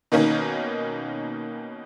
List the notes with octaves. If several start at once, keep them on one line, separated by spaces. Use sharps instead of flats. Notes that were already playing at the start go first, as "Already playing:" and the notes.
B2 D#3 A#3 C#4 D#4